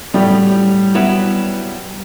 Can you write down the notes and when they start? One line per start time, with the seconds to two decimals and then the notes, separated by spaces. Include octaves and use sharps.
0.14 A2 F#3 G3 A3 G4
0.95 F#3 B3 E4 B4